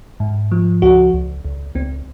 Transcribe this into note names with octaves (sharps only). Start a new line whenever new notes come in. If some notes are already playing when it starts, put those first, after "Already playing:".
G#2
F3
C#2 F#4
C#2
C#2
C#2 C4